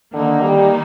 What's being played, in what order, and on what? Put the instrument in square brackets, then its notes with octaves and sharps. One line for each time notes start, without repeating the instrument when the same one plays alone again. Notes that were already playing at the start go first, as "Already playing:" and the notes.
[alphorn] D3 [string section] D#3 A#3 D#4
[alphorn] G3